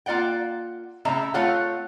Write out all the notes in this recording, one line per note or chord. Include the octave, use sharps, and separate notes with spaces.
A#3 F4 D5 F#5 G5
A2 C#3 E5 A#5
A3 C4 F4 C#5 F5 F#5